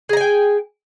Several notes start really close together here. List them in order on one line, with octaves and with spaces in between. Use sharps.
G#4 A#5 G#5 G5